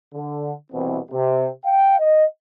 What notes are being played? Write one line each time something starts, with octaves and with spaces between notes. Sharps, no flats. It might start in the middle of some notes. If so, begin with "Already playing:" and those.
D3
C2 B2 E3 C4
C3
F5 G5
D#5